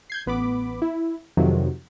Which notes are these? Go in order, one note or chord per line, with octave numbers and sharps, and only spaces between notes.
G6 G#6 C7
A1 B3 B5 D6
E4
F2 C3 D#3 F3 F#3